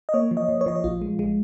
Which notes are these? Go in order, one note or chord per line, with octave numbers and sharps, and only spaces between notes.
D#5
A#3 C#5
F3
D#5
F3
C#5
F3 D#5
C#5
A#1 F4
G#3
G#3